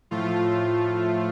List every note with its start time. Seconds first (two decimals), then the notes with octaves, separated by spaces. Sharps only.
0.11 A2 F3 A3 F4